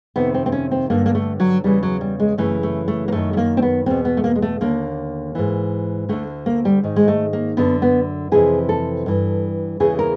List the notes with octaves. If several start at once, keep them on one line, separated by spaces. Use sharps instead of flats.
F2 C3 D#3 B3
C4
C4
C#4
C4
G2 D3 A#3
A#3
A3
F#3
E2 C#3 E3 G3
F#3
G3
G#3
F#2 C#3 E3 A3
A3
A3
A#3
F#2 D#3 A3
A3
A#3
C4
B3
E2 B2 C4
B3
A3
A#3
G#3
A3
D#2 D3 A#3
G#2 E3
D2 D3 A3
A#3
G3
G#2 D#3
G#3
A3
A#3
F#2 D3 B3
B3
F2 C3 E3 G#4
A4
G2 E3
E2 C#3 E3 G#4
A#4